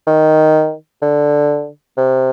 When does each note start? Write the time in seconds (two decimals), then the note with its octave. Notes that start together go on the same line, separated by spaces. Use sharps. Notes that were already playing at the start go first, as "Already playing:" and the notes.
0.07 D#3
1.02 D3
1.97 C3